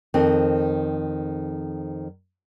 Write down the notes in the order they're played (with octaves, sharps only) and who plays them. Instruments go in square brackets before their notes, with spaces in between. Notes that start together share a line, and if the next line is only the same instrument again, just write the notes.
[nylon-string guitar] F2 D#3 C4